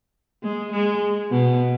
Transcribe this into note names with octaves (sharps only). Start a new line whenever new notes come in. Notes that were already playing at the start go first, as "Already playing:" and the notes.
G#3
G#3
B2